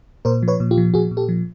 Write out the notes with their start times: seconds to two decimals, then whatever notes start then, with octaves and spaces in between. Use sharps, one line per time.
0.25 A#2 A#4 C5
0.43 F3
0.48 B4 C#5
0.60 A#2
0.71 F4 G4
0.78 F3
0.94 A#2 F#4 G#4
1.11 A#2
1.17 G4 A4
1.29 F3